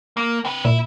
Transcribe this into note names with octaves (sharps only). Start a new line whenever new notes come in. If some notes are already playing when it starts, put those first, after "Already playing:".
A#3
C4 B4
A#2 E4